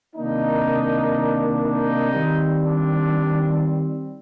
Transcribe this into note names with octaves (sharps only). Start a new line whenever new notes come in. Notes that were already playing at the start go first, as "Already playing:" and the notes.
C3 D#3 A#3 D4 D#4
D#4
D#3 G3 C4
D4